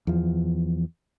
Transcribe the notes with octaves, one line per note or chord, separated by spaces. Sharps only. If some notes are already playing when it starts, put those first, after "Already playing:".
E2 F3